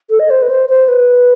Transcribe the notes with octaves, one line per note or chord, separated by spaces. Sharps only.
A4
D#5
C5
B4
C5
C5
B4